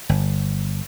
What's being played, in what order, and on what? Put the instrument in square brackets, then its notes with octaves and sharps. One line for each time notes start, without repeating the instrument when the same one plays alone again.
[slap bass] G1